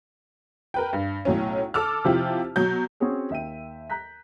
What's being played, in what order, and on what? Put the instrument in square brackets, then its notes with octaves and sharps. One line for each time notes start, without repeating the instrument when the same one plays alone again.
[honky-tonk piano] A#4 B4 G5
G2
B1 A2 F#3 C#4
A4 D6 E6 F6
C3 F3 E4 F4 G4
B2 F#3 G6
[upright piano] C4 C#4 F#4 G#4 C#5
D#2 E5 G5 D#7
A#5 F#6 G6 B6